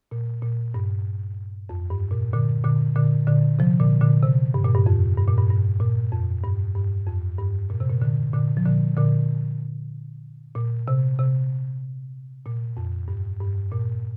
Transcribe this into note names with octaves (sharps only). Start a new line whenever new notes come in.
A#2
A#2
G2
F2
G2
A#2
A#2 D3
A#2 D3
A#2 D3
A#2 D3
C3 F3
A#2 D3
A#2 D3
C3
G2
A#2
G2
F2
G2
A#2
G2
G2
A#2
F2
G2
G2
F2
G2
A#2
C3
A#2
A#2 D3
A#2 D3
F3
A#2 D3
A#2 D3
A#2
C3
C3
A#2
F2
G2
G2
A#2